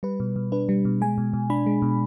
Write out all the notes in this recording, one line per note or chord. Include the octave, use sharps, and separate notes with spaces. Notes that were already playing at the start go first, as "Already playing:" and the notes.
G3 B4
B2
B2
D4 B4
G3
B2
G#3 G#5
B2
B2
D4 B5
G#3
B2